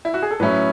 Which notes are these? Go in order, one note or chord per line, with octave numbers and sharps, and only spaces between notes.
E4
F#4
G#4
A4
A2 F#3 C#4 E4 B4